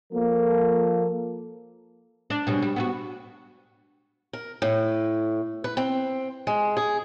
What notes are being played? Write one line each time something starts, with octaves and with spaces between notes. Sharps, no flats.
F3 A#3 A4
D4
B2 G3 C#4
G3
B3 C#4 F#4
A#4
A2
B4
C4
G#3
G#4